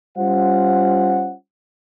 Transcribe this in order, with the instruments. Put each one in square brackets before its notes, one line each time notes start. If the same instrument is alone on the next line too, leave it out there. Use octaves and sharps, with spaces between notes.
[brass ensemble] G3 C#4 F4 C5 F#5